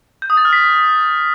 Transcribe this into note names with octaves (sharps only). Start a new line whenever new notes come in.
G6
D#6
A6
F6
B6